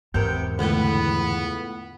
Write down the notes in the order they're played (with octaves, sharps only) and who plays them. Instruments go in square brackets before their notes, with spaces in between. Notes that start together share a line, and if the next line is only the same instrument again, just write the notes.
[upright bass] E2 G#2 [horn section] C3 B3 G5 [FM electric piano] A#4 G6
[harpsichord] C#2 A2 [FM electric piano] D3 [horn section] B3